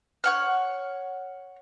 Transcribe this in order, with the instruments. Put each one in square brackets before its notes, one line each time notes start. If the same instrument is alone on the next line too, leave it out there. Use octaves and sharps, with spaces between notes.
[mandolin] C#5 F#5 F6